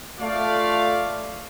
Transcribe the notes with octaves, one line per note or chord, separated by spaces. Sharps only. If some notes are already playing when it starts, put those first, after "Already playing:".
A3 F4 D5 F5